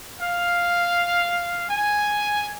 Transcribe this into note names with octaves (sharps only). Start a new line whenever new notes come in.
F5
G#5